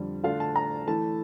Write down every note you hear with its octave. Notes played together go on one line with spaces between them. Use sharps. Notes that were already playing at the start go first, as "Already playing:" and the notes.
Already playing: F2 D3 G3
D3 A3 D4 F4 F5
A5
A#5
E3 A3 E4 A5